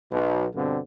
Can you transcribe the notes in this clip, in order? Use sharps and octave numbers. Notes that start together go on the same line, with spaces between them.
B1 B2
G2 B2 D3 C4